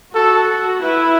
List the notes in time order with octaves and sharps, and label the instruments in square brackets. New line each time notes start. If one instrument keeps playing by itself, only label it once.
[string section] F#4 [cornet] A4
[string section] E4 [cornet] B4